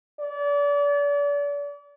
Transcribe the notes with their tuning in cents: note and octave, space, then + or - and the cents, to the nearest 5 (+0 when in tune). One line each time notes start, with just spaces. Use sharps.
D5 -35